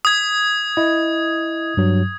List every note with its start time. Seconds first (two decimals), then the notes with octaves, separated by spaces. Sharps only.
0.05 D#6 G#6
0.77 E4 D#5
1.77 G2 F#3